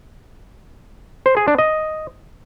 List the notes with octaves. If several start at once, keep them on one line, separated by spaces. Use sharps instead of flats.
C5
G#4
D4
D#5